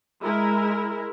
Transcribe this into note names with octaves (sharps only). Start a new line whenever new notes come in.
G#3 E4 A#4